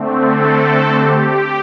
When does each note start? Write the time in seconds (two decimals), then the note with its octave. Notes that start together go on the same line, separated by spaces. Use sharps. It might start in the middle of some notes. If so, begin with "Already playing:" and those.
Already playing: D3 A3 C4
0.26 A4
1.00 G4